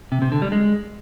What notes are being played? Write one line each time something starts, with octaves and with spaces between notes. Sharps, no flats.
C3
C3
D3
G3
G#3